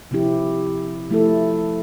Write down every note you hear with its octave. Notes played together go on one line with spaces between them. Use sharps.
C3 F3 C4 E4 G4
F3 A3 E4 A4